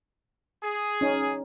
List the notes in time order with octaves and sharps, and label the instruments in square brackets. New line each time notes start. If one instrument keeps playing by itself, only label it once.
[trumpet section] G#4
[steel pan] C#4 D#4